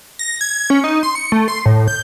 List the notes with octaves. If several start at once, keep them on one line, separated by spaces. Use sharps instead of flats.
A#6
G#6
C#4
D#4
C6
C#7
A3
C6
A2
G6